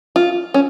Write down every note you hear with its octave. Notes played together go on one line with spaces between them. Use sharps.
F4
C#4